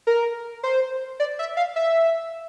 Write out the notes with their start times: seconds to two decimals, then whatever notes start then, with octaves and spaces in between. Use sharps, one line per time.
0.07 A#4
0.63 C5
1.20 D5
1.39 E5
1.57 F5
1.76 E5